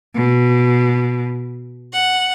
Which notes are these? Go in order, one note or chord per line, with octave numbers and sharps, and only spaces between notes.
B2
F#5